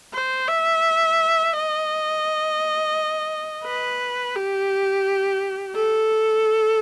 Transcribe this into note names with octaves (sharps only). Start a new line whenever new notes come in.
C5
E5
D#5
B4
G4
A4